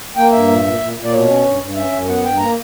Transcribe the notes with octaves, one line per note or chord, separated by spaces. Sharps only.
A#3 G5
G2 E5
A#2
A#2
A#2
A#2
D5
B2 C#5
C#4
G2
G2
C#4 E5
F#2
B3 F#5
G2 G5
A#3 A#5